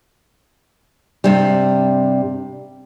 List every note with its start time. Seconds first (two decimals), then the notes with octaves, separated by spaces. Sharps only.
1.24 G2 C3 G3